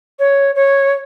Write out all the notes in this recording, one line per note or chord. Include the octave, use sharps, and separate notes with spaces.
C#5
C#5